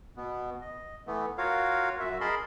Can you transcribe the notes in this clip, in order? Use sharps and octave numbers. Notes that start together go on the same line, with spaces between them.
B2 B3
D#5
E3 A3 B3
F4 F#4 A#4 C#5 F5
F#2 F#4 E5
G#4 A#4 D#5 A5 B5 C6